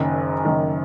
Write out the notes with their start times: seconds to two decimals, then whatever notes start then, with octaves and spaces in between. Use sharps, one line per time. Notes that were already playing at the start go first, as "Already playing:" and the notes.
Already playing: F#1 F#2 D#3
0.45 F#1 F#2 D#3